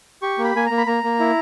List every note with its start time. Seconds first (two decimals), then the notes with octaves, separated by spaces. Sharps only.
0.22 G4 C#6
0.38 A#3
0.44 B5
0.55 A#3 G#5
0.66 A#3 A#5
0.78 B5
0.87 A#3 A#5
1.04 A#3
1.20 E4